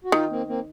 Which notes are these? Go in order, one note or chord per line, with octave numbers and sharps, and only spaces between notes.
F#4
D#3 D#4 F4
A#3 C4
A#3 C4